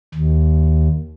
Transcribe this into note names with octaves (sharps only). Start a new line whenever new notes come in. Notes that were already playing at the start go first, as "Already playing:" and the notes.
D#2